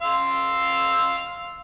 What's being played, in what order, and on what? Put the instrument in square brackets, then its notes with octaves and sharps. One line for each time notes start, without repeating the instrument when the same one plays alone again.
[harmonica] F5 C6 E6